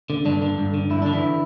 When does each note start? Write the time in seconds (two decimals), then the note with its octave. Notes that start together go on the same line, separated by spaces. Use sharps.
0.10 D3
0.25 G2 D3 D4
0.42 D3
0.58 G2
0.74 D3
0.90 G2 E4
1.02 D3 D4
1.13 E3 E4